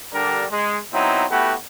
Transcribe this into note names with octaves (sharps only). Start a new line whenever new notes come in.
D3 G3 D4 G4 A#4
G#3
F#3 B3 C4 D#4 E4
A3 B3 E4 F#4 G4